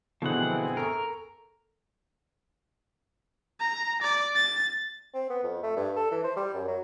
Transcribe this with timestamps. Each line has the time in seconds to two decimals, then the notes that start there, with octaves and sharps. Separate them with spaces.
0.22 B2 D3 E3 F3 C4 E4 G#4 F#5
0.77 A4 A#4 C#6
3.60 A#5
4.02 D5
4.35 A6
5.14 C4
5.30 B3
5.44 F2
5.63 A3
5.76 G2
5.97 A4
6.11 E3
6.24 C5
6.37 G3
6.54 F#2
6.68 F#3